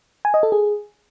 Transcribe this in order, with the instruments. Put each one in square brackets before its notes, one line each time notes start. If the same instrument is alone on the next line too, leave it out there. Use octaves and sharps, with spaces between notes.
[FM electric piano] G#5
D#5
A4
G#4